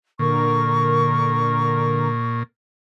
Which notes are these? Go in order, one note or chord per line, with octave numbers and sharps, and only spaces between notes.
A#2 D3 A#4 C#6